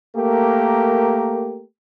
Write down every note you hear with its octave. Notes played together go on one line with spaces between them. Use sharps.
A3 A#3 G4 A#4